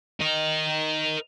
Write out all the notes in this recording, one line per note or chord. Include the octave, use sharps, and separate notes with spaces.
A#4 D#5